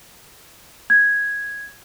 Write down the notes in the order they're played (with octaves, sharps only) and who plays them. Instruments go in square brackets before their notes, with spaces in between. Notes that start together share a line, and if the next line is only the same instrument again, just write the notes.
[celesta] G#6